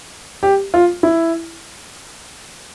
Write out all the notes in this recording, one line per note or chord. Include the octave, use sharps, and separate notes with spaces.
G4
F4
E4